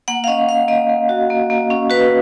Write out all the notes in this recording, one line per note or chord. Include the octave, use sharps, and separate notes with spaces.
A#3 F#5
F5
C#4 D#5
C#4 F5
A#3 D#5
A#3
F#4
A#3
A#3
C#4
F#4 B4